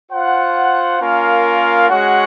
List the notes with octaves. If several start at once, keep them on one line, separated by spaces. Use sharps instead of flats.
F4 C5 F#5
A#3 C#4 F4 A#4 F5
G#3 C#4 F#4 C#5 F#5